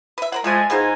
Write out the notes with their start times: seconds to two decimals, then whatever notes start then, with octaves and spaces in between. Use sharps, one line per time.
0.18 B4 E5
0.32 A#4 C5 F#5
0.44 F3 G#3 A3 G#4 E5 G#5
0.70 G#2 B3 D#4 F4 C5 G#5